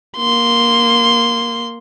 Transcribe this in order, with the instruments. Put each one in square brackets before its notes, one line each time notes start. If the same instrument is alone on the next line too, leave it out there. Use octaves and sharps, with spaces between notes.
[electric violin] A#3 C6